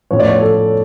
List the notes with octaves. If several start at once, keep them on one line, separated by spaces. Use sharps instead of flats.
A2 F3 C#4 C#5
D5
C#5
A4